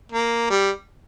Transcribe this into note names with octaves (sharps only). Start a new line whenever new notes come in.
A#3
G3